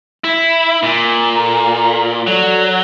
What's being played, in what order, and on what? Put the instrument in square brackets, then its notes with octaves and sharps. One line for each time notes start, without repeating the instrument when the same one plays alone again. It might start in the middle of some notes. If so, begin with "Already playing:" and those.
[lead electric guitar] E4
A#2
[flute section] A4 A#5
[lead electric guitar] F#3 [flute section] A4 D5